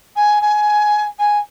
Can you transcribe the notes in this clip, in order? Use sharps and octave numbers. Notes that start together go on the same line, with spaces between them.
G#5
G#5
G#5